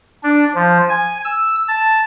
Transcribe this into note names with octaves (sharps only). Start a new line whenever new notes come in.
D4
F3
G#5
E6
A5